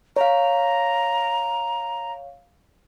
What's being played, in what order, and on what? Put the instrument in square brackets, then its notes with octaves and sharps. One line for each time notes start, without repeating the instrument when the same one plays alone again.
[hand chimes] C#5 F5 [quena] A#5